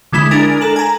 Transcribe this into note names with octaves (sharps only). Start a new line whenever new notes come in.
D3 G#3 E4 B5
D4 A#4 G#5
A4 A#5 F#7
G#5 A#5